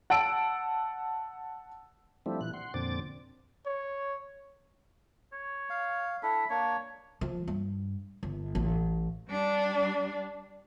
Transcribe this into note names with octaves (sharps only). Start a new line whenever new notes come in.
F#5 A5 E6 D7
F3 G3 A3 C4 D4 E4
A#2 E3 F#6
F#5 C6
F2 A#2 D3 C4 D6 A6
C#5
C#5
F5
D4 E4 A4 B5
A#3 D4 C#5
F3
G2
G1
A1
G3 D4